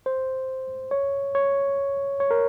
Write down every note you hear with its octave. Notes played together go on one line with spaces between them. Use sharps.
C5
C#5
C#5
C#5
A#4